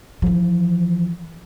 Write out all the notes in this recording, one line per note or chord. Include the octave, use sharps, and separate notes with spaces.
E3 F3